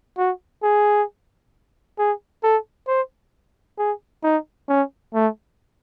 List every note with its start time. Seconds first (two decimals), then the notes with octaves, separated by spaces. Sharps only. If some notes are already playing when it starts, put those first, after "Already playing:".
0.17 F#4
0.62 G#4
1.98 G#4
2.43 A4
2.87 C5
3.78 G#4
4.23 D#4
4.68 C#4
5.14 A3